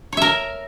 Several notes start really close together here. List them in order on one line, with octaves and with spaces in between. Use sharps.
C#5 E5 A#4